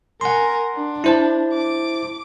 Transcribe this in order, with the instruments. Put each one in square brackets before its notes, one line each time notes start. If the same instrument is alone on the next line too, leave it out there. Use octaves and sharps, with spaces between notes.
[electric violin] A#4 G#5 [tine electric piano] F#5 C6
[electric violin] D4
[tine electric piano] E4 C5 A5
[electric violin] D6